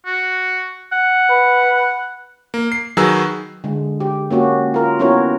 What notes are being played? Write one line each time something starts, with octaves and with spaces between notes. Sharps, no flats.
F#4
F#5
B4
A#3
C7
D#3 F#3 G#4 B4 A#5 E6
D3 G#3
G4
A#3 C#4 F#4 G4
F4 A#4
B3 C#4 E4 F#4 A#4 C#5